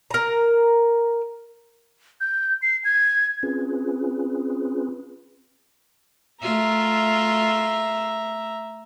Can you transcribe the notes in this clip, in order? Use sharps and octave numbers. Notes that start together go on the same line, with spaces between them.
A#4 A#5
G6
C7
G#6
C4 C#4 F4 G#4 B4
A3 F4 E5 A#5